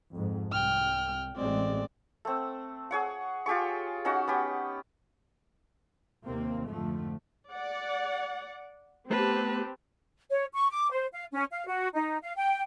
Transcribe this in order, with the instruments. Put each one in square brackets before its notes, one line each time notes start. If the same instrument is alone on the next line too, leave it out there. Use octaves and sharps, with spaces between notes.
[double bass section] F2 G#2
[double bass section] C2 [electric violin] G5 F6
[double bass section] A1 G#3 [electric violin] C4 D5
[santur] A3 C4
G#4 C#5 F#5
F4 G4 G#4 C#6
C#4 D#4 F#4 F#5
B3 C#4 G4
[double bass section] D#2 C3 D#3 A#3 C4
F2 G#2 D3 F3 A3
[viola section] D5 F#5
[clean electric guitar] A3 B3 C5 [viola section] C4 G4 [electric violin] B4 A5
[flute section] C#5
C#6
D6
C5
F5
C#4
F5
F#4
D#4
F5
G5